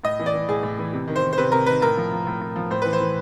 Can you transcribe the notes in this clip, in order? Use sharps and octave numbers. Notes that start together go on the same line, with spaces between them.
A2 D#5
E3
D5
E3
A2 G#4
A2
E3
C3
D#3
C5
D#3
C5
C3 B4
C3 A#4
D#3 B4
A2 A#4
F3
F3
A2
A2
F3
A2 C5
E3 B4
C5
E3